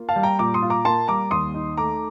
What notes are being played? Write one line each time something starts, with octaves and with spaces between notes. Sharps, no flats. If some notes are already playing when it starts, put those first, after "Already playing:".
Already playing: A#3 F4
F5 A5
G3
G5 A#5
A#2 A#5 D6
C6 D#6
F4
A#5 D6
A#3 A5 C6
G3 A#5 D6
D#2 C6 D#6
D#4
A3 A#5 D6